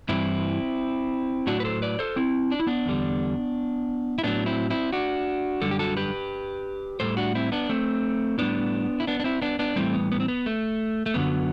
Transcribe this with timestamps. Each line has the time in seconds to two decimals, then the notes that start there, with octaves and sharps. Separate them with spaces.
0.09 G2 E3 G3 C4 E4
1.47 A2 F#3 D4 F#4
1.60 B4
1.64 A4 C5
1.82 B4 D5
1.99 A4 C5
2.16 C4 E4
2.51 D4
2.60 E4
2.67 B3 D4
2.86 E2 D3 G3
4.18 E4
4.23 A2 F#3 B3 D4
4.46 C4 E4
4.70 C4 E4
4.93 D4 F#4
5.62 F#2 D3 G3 A4
5.71 G4
5.79 F#4 A4
5.97 G4 B4
7.00 A2 G3 A4 C5
7.17 D4 F#4
7.35 C4 E4
7.52 B3 D4
7.69 A3 C4
8.38 A2 G3 B3 D4
9.00 E4
9.07 B3 D4
9.20 D4
9.24 C4 E4
9.42 B3 D4
9.59 B3 D4
9.76 A2 E3 G3 A3 C4
9.93 B3
10.12 B3
10.20 C4
10.28 B3
10.46 A3
11.06 A3
11.14 F#2 D3 F#3 B3